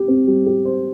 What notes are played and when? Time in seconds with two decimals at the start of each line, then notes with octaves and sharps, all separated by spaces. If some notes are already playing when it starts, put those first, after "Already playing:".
Already playing: G4
0.08 C4
0.27 G3
0.46 G4
0.65 C5